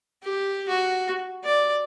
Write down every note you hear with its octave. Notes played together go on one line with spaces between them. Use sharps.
G4
F#4
D5